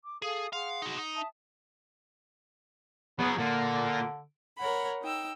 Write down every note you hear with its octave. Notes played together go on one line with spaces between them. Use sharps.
D6
G#4 A4 F5 D#6
G#4 F5 F#5 C6
D#4 F#4
D#4
E5 A5 D#6
F#3 B3 G#4
A#2 D3 A#3
A#4 C#5 F#5 B5
D#4 G5 E6